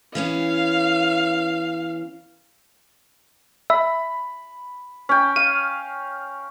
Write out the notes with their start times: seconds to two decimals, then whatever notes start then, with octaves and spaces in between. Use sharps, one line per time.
0.15 E3 B3 C#4 F5
3.70 E5 B5
5.09 C#4 G5
5.36 F5 D#7